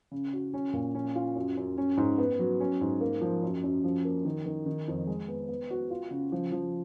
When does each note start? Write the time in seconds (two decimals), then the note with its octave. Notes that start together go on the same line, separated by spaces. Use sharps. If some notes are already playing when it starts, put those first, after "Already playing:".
0.11 C#3
0.33 F#4
0.54 C#4
0.73 A#2
0.95 C#4
1.15 F4
1.36 F#2
1.57 F#2
1.78 C#4
1.97 G#2
2.18 B3
2.39 F#3
2.60 C#4
2.81 G#2
3.01 A#3
3.21 F3
3.43 F#2
3.63 F#2
3.84 F3
4.05 A#3
4.25 D#3
4.46 D#3
4.66 D#3
4.88 F2
5.07 G#3
5.28 B3
5.49 B3
5.70 F#4
5.90 F4
6.11 C#3
6.32 F3
6.52 F3